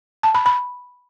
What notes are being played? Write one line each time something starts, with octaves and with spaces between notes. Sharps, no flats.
A5
B5
B5